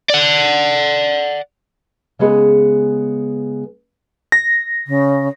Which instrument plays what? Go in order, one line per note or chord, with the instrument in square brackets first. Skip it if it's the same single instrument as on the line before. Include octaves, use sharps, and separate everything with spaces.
[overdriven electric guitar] D5 F#5
[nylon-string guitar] C#3 G#3 B3 G#4 A4
[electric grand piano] A#6
[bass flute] C#3